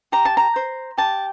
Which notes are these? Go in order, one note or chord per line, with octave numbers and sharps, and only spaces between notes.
G4 A#5
A5
A#5
C5
G4 A5